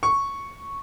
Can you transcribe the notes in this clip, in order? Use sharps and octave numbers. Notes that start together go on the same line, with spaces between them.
C#6